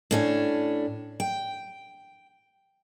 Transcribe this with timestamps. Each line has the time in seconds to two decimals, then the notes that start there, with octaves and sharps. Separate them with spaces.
0.11 A2 C#4 D4
1.20 G5